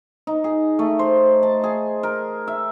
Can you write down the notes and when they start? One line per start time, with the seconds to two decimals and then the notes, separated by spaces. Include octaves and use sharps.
0.27 D#4
0.44 G#4
0.79 A3
0.99 C5
1.43 A5
1.63 G#4
2.03 A#4
2.48 E5